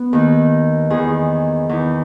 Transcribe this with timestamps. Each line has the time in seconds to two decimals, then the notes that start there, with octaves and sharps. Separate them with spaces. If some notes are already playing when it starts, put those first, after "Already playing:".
Already playing: B3
0.13 D#2 D#3
0.90 E2 D#3 G#4
1.69 E2 D#3